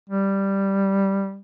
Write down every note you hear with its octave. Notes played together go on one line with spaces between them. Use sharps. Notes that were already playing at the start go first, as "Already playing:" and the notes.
G3